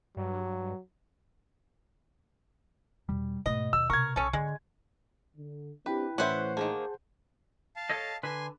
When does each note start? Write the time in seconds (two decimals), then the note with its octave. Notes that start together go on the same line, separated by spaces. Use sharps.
0.17 G2 F#3
3.09 E2 B2 G3
3.46 G#2 B2 A3 D#5
3.73 D#2 E6
3.90 C3 A#4 C#6 G#6
4.16 B1 C#4 A4
4.33 G#2 D3 G#3
5.37 D3
5.86 C4 D4 E4 G4 B4 G5 B5
6.18 A2 E3 C#4 B4 C5 E5 F#5
6.57 D#3 F#3 A#3 G#4 A5
7.76 F5 A5
7.90 A4 C#5 D#5
8.23 D3 B4 G#5 C6